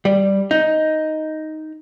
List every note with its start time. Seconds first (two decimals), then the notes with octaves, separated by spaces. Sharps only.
0.05 G3
0.51 D#4